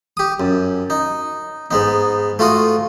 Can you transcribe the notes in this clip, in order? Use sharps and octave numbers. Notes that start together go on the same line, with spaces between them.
G4 D#6
F#2
D#4
G#2 B3 D#4
A3 F4 F#4 F#5 D#6